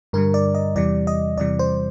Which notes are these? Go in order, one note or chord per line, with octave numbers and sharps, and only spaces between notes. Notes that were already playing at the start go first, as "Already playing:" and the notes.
G2 D3 G3 A#4
D5
D#5
E2 C3 E3 G3 D5
D#5
E2 C3 E3 G3 D5
C5